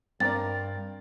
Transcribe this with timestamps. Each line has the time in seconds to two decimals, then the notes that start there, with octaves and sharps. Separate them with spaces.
0.20 G2 C4 A#4 D5 A6